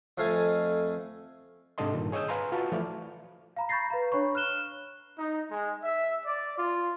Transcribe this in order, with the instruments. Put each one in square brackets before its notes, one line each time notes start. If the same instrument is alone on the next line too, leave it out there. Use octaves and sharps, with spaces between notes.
[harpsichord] F2 A3 F5 G#5 D#6
[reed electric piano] G#2 C3 D4 A4 D#5 C6
G2 A#2 D#3
G#4 C#5 D#5 D#6 E6 G6
B4 F5 G#5 A#5 C6
F4 F#4 B4 A5 C#6
E3 F3 A3 D5 F5 F6
[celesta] F5 A#5 B5
B5 C#6 G6 A6 A#6 C7
B4 F5 A#5
D4 C#5 B5 C#6
F6 F#6 E7 G7
[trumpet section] D#4
G#3
E5
D5
F4